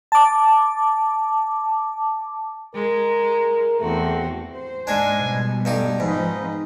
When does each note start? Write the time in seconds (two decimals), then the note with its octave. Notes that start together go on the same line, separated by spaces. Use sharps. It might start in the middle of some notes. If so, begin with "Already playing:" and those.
0.12 A5 D6
2.75 G#3 A#4
3.80 E2 A3 C4 F#4
4.53 C5
4.87 G#2 G#3 D4 G#5
5.19 B2 G3
5.65 G2 A3 D#4 G4
6.00 G#2 F3 C4 D#4 B4